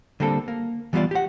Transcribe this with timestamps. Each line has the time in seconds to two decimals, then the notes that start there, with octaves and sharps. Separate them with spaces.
0.20 D3 G3 A#3 C4 A4
0.48 A#3
0.93 E3 G3 B3 E4 F4 D5
1.11 G4 F#5